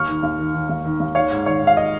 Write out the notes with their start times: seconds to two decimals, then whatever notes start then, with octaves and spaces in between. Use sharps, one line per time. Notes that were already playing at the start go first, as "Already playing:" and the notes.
Already playing: D#2 C#6 F6
0.08 D#3
0.23 D#2
0.39 D#3
0.54 D#3
0.69 D#2
0.85 D#3
1.00 D#2
1.15 D#3 C#5 F5
1.31 G#2
1.46 D#3 C#5
1.61 G#2
1.67 F5
1.77 D#5